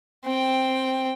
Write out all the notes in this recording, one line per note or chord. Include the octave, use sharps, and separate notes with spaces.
C4 G5